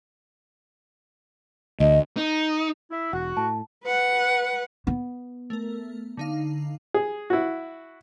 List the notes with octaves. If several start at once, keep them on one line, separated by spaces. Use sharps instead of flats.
D2 D#5
D#4
E4
E1 F#4 F#5
A2 A5
B4 F#5
B3
A3 A#4
D3 D#4 F5
G#4
E4 F#4